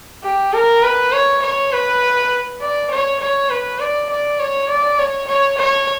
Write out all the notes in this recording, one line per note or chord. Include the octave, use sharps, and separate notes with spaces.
G4
A#4
B4
C#5
C#5
B4
D5
C#5
C#5
B4
D5
D5
C#5
D5
C#5
C#5
C#5